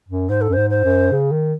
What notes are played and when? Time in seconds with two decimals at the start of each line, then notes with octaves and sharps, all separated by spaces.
0.09 F#2
0.29 G#2 C5
0.41 A4
0.49 F#2
0.53 G#2 C5
0.70 C5
0.84 F#2
1.12 C#3
1.32 D#3